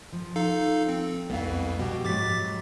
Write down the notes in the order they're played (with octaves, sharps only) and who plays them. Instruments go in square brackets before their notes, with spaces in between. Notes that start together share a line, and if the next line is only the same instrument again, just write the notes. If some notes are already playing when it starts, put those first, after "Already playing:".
[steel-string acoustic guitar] F3
[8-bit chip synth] D#4 A4 F5
C4
[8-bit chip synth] C2 F2 [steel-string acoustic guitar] B3 F5
[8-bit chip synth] B2 [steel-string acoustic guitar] F#4 G4
[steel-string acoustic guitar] G#2 F#3 [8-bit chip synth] D6 A6 B6